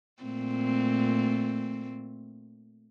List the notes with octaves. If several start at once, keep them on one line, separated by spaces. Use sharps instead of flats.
A#2 A3 C4